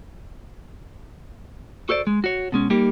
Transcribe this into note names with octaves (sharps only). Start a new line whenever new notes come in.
F#4 A4 C5 D5
G#3
F#4 C#5
B2 G#3 C#4
G3 A#3 D#4 G4